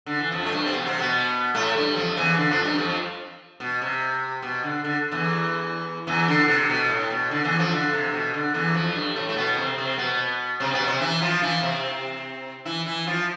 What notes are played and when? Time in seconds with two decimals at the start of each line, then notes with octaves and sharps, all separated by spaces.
0.06 D3
0.19 E3
0.31 F2 F3
0.45 A3
0.52 G2 G3
0.67 C4
0.72 B2 B3
0.86 C3 C4
1.00 B2 B3
1.55 A2 A3
1.75 G2 G3
1.96 F2 F3
2.17 E2 E3
2.37 D3
2.51 F2 F3
2.65 G2 G3
2.78 F2 F3
3.60 B2
3.82 C3
4.42 B2
4.63 D3
4.84 D3
5.11 E2 E3
6.07 E2 E3
6.28 D3
6.48 C3
6.69 B2
6.90 A2
7.10 B2
7.31 D3
7.44 E2 E3
7.59 F2 F3
7.71 D3
7.93 C3
8.13 B2
8.34 D3
8.54 E2 E3
8.74 F2 F3
8.95 G2 G3
9.16 A2 A3
9.29 A3
9.36 B2 B3
9.57 C3 C4
9.78 C3 C4
9.98 B2 B3
10.60 C3 C4
10.74 B2 B3
10.88 C3 C4
11.01 E3 E4
11.22 F3 F4
11.42 E3 E4
11.62 C3 C4
12.65 E3 E4
12.86 E3 E4
13.07 F3 F4